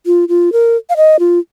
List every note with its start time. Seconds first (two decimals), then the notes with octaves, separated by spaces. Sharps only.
0.06 F4
0.29 F4
0.52 A#4
0.90 F5
0.97 D#5
1.19 F4